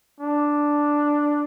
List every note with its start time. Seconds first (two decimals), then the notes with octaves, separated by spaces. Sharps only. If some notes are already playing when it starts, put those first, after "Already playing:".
0.20 D4